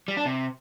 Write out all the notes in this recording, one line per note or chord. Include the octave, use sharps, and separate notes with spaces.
G3
D4
C3